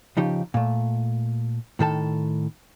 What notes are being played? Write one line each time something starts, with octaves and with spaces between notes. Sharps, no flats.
C#3 F3 D#4 G4
A#2 A3
A2 D#3 A4 A5